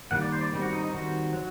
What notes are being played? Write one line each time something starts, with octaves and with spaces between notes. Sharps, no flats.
D#3 G3 A#3 F#5
D5
C5
D5
D#3 G3 C4
F#4
D#4
D#4
D#3 G3 C4 F#4
F#3